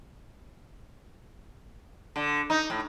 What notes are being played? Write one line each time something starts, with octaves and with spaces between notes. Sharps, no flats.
D3
D#4
A2